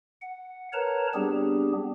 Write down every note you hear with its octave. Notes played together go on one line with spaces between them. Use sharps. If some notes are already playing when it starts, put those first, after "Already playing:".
F#5
A#4 B4 C#5 A5 A#5
G3 B3 C4 D4 G4 G#4